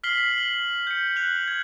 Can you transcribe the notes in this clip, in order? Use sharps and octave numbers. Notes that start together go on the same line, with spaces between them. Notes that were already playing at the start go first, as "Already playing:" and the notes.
F6 B6 C7 F#7 G7
F#7
G6 C#7
F#6 F7 F#7
F#6 G#6